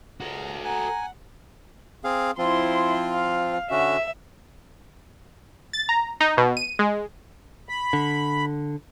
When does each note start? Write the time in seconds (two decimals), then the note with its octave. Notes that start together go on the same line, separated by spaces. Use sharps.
0.20 C#2 F#4 A4 A#5
0.65 F#5 G#5 A#5
2.04 C4 G#4 F5
2.38 F3 C4 E4 F4 C6
3.13 F5
3.71 D3 C#4 F#4 E5
5.73 A6
5.89 A#5
6.20 D#4
6.37 B2
6.57 D#7
6.79 G#3
7.69 B5
7.93 D3